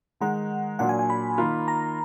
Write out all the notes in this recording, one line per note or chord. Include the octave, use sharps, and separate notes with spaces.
D#3 G#3 D#4 F#5
A#2 F#3 D4 F#5
G#5
G#5
B5
D#3 A#3 F4
A#5